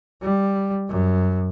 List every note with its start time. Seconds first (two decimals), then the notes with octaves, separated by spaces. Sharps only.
0.22 G3
0.89 F#2